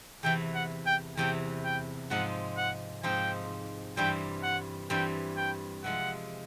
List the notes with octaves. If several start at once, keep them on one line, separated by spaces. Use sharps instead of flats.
E2 C3 E3 G5
F#5
G5
E2 C3 E3 G5
G5
G#2 F3 G#3 C4 D#4 F#5
F#5
G#2 F3 G#3 C4 D#4 G5
G2 E3 G3 C4 G5
F#5
G2 E3 G3 C4 G5
G5
C3 F3 G#3 F#5